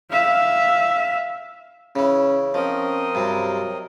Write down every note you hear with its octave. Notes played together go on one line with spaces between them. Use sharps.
E5 F5
C#3 E3 C#4
F3 C4 C#4 A#4 D#5
G2 C3 F#3